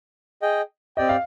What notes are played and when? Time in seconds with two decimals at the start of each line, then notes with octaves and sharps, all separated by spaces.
0.42 G#4 D#5 G5
0.97 C4 G4 D5 D#5 G5
1.09 F5